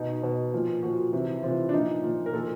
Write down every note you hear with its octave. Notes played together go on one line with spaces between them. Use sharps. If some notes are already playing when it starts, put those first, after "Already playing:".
Already playing: B2 D#4
B2
A#2 F3
A#2 F3 F#4
C3 E3
C3 E3 F4
D4
A#2 F3 D#4
A#2 F3
A#4
A#2 F3 A4